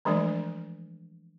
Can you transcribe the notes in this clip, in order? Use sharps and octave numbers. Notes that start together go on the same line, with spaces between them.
E3 F3 G#3 A3 D4 D5